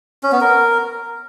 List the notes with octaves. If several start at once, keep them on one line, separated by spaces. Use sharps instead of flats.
C#4
B3
A#4